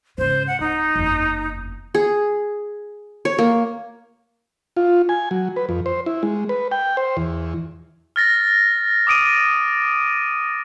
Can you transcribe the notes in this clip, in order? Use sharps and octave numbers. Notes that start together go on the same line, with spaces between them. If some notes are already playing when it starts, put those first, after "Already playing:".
G#2 C#3 C5
F#5
D1 D#4
F#1 E2
G#4
C#5
A#3
F4
G#5
F#3
B4
F2
C5
E4
G#3
B4
G5
C5
E2
F6 A6 A#6
D6 D#6 D7 D#7